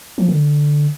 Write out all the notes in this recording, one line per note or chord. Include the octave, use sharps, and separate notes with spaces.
F3
D3